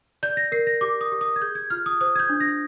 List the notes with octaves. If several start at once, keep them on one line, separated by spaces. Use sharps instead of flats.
D5 G6
A#6
A#4 C7
A#6
G4 D6
D#6
G4
D#6
G#6
G#4 G6
G#6
F4 F6
D#6
C5 D#6
G#6
G6
D4
A#6